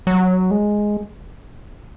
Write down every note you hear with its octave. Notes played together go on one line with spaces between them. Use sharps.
F#3
G#3